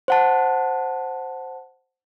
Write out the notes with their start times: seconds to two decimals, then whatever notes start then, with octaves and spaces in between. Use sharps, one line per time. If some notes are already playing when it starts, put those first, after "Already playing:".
0.08 C5 F#5 A5